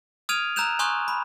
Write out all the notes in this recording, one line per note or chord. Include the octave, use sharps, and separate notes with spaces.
D#6 F6 G#6 D7 D#7 F7
A#5 E6 F#6 G6 E7 F7
G#5 C6 C#6 D#6 F#6 G6
B5